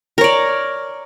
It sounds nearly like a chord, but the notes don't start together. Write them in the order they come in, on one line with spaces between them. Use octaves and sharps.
A#4 C#5 D5